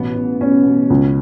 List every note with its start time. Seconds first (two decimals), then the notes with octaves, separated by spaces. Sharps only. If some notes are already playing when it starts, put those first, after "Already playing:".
Already playing: A1 B2 B3
0.16 B2
0.41 B2 C#4
0.65 B2
0.90 C#2